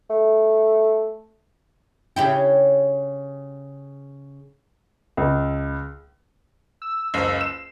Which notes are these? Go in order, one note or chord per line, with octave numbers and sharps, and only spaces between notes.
A3
C#3 E4 G4
C#2
E6
F#1 C#2 C7
E7